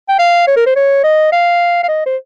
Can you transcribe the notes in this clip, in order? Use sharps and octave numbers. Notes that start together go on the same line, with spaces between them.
G5
F5
C#5
A#4
C5
C#5
D#5
F5
F5
D#5
C5